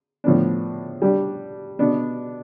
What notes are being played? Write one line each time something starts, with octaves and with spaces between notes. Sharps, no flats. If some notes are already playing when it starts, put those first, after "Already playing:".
A2 F3 B3 D4
G3 D4 G4
B2 B3 D4